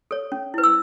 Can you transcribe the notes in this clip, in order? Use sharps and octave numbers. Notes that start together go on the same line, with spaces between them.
A4 C#5
C#4
E4 B4
E6